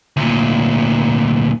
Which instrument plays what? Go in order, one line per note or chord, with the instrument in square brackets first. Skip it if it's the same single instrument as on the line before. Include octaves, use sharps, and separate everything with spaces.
[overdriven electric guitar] D2 A#2